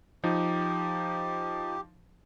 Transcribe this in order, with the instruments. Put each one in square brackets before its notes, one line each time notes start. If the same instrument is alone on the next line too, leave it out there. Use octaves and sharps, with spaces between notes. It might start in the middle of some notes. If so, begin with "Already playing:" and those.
[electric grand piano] F3 D#4 [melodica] G4